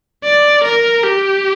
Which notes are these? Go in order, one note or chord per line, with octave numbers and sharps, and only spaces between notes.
D5
A#4
G4